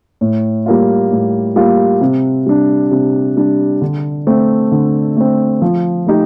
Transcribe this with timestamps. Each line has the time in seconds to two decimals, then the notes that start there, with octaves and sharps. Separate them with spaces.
0.21 A2
0.66 G3 A#3 F4
1.11 A2
1.56 G3 A#3 F4
2.01 C3
2.46 G3 D4
2.91 C3
3.37 G3 D4
3.81 D3
4.27 A3 C4
4.72 D3
5.17 A3 C4
5.62 F3
6.07 A3 D#4 G4